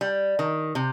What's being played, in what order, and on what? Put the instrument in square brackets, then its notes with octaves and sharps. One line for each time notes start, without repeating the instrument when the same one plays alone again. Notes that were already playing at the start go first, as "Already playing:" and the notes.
[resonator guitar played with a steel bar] G3
D#3
C3